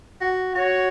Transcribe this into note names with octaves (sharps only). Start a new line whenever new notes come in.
F#4
F#4 C#5